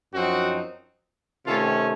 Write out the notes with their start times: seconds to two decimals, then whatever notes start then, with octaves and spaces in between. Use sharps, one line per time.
0.13 F#2 F3 C4 D#4 F#4
1.46 C3 D#3 A3 C#4 F4 A4